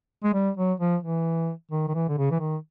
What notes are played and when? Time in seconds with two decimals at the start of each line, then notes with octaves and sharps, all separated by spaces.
0.24 G#3
0.34 G3
0.57 F#3
0.80 F3
1.03 E3
1.71 D#3
1.88 D#3
1.94 E3
2.09 D3
2.18 C#3
2.31 E3
2.40 D#3